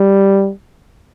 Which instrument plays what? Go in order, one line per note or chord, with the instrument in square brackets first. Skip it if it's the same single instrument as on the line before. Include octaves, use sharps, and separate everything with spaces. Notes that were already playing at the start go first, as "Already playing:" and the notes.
Already playing: [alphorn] G3